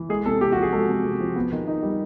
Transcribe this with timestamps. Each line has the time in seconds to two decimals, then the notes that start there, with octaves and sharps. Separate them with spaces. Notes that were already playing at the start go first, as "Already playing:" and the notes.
Already playing: E3
0.09 G#3 G#4
0.26 C3 A4
0.41 C3 G4
0.52 F#4
0.57 F3
0.62 G#4
0.73 G#3 A4
0.89 C3
1.04 C3
1.20 F3
1.36 B3
1.52 D#3
1.68 D#4
1.83 G3